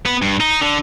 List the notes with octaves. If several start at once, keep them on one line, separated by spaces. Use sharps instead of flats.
B3
G2
D#4
D3